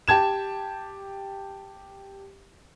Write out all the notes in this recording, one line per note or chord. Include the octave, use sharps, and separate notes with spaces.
G4 A5 G#6 E7